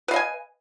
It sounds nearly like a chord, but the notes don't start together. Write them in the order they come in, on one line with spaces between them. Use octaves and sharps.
B4 F5 D#5 G#5